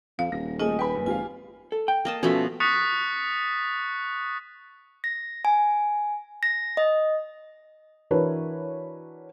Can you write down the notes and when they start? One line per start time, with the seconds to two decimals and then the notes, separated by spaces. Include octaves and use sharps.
0.19 F2 F5
0.32 D#1 A#6
0.60 F3 A3 A#3 G#4 D#5 G#5 D#6
0.79 B4 G5 G#5 B5
0.95 F#1
1.06 G#1 F4 G4 F5 G#5
1.72 A4
1.88 G5
2.05 A#3 D#5 A5
2.23 B2 F3 A3 C#4 A4 E5
2.60 C#6 D#6 F#6 A6 B6 C#7
5.04 A#6
5.45 G#5
6.43 A#6
6.77 D#5
8.11 E3 D4 F#4 A#4 B4 C#5